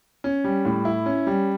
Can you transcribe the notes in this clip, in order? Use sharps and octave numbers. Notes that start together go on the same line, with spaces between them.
C#4
G3
A2
E4
C#4
G3